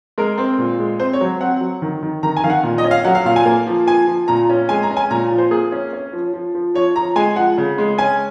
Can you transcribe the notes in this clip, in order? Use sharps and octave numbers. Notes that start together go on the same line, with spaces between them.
G#3 A#4
C4
A#2
G#3
C4 C5
C#5
F#3
C4 F#5
F#3
D#3
D#3
D#3 A#5
G#5
D#3 F5
F#5
A#2
D#5
C#4
F5
F#3 F#5
F5
A#2 F5
G#5
A#3
F3
F3 G#5
F3
A#2 A#5
C#4
G#3 G#5
A#5
C#4
G#5
A#2 A#5
F3
C5
A#3 G#4
C#4
C#4
F3
F3
F3
F3 C#5
F3 A#5
G#3 G#5
F3 F#5
C#3
G#3
C#4 G#5